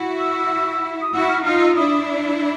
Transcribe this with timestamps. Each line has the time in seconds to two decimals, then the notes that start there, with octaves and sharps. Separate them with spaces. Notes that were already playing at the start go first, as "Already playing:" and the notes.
Already playing: E4 F#4
0.20 E6
1.02 D#6
1.13 E4 F#4 E6
1.29 F6
1.45 D#4 F4 F6
1.61 E6
1.76 D4 E4 D#6